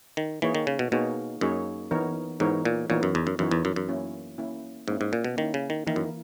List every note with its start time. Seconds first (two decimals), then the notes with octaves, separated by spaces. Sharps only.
0.17 D#3
0.42 E3 A#3 D#4 G#4 C#5
0.55 D#3
0.67 C#3
0.79 B2
0.92 B2 A#3 D#4 G#4 C#5
1.41 F#2 A#3 D#4 G#4 C#5
1.91 E3 B3 D#4 A#4 C#5
2.40 G#2 E3 B3 D#4 A#4 C#5
2.65 A#2
2.90 A#2 E3 B3 D#4 A#4 C#5
3.03 F#2
3.15 E2
3.27 F#2
3.39 F#2 E3 B3 D#4 A#4 C#5
3.51 E2
3.65 F#2
3.76 F#2
3.89 A#3 C#4 E4
4.38 A#3 C#4 E4
4.88 G#2 A#3 C#4 E4
5.01 G#2
5.13 A#2
5.24 B2
5.37 D#3 A#3 C#4 E4
5.54 C#3
5.70 D#3
5.86 D#3 E3 A#3 E4 A#4
5.96 F#2